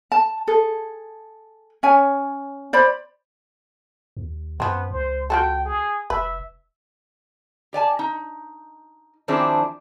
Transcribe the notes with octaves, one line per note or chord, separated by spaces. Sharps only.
A5
G#4 A4
C#4 C#5 G#5
C5 D5 B5
D#2
F#2 F3 B3 C4
C#2 C5
F4 F#4 A4 G5
G#4
F1 B4 E5
G4 D5 G#5 A5
D#4
D#3 F3 C4 D4 E4 G#4